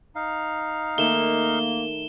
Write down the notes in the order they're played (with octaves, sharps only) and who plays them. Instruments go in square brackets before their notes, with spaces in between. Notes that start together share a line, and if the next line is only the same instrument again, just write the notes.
[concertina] D#4 F5
[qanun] D#3 A3 [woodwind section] A#3 [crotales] E7 G7